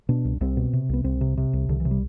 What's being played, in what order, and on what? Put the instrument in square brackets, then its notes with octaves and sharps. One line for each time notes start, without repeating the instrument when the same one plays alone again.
[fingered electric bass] B2 D4
C2
C2 C4
B2
C3
C2 B3
C2 C4
C3
C3
C2
C2 D3
E3
C3
G3